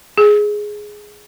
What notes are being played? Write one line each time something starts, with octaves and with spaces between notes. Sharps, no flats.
G#4